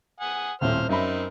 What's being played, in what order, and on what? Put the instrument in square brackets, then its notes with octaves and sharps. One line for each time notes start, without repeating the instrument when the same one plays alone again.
[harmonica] F#5 G#5 D#6
[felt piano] D#1 A2 C4 [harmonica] C5 F6
[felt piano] F#2 E5 B5 [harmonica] C4 D#4 A#4